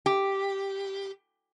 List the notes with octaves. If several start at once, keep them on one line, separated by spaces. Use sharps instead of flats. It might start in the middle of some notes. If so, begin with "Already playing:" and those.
G4